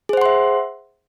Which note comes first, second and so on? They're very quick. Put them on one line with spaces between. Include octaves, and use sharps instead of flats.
G#4 C5 F#5 C6 E5